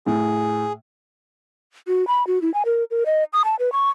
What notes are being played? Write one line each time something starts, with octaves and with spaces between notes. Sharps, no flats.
A2 G#4
F#4
B5
F#4
E4
G#5
A#4
A#4
D#5
D#6
A5
B4
C#6